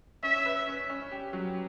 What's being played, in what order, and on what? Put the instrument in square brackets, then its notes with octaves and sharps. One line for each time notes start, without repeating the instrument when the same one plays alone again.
[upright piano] C#4 [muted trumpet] E5
[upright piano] B4
C#4
C#4
G4
F#3